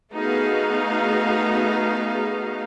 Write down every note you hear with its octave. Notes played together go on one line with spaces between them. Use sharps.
A3 B3 D#4 F#4 G#4 F5